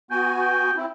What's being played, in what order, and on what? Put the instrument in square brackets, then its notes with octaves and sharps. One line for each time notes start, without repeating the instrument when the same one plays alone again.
[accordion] B3 F#4 G#5 [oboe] G5
[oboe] G5
[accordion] C4 E4